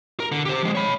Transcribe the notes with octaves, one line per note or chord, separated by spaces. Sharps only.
A#4
D3
G4 C5
F3 G#3
C#5 B5